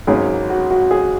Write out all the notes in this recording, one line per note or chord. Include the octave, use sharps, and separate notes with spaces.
G#1 G#2 F#3 C#4 G#4
F#4
F#4
G#4